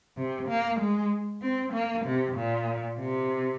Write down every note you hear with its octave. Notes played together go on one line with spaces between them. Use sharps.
C3
A#3
G#3
C4
A#3
C3
A#2
C3